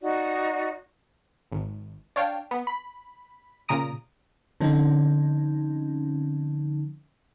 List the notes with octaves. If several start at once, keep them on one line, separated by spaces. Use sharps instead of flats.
D#4 F#4 D5
G#1
D4 C#5 F5 G5
B3
B5
A#2 C#3 A#5 D#6 D7
D3 F3 C4 C#4 D#4